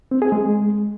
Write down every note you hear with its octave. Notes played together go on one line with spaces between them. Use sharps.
C4
G#4
G#3